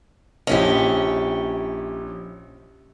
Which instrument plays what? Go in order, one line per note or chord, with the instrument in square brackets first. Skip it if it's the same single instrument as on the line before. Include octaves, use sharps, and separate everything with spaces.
[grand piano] A#1 D#5 [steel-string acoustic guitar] C#4 E4 G4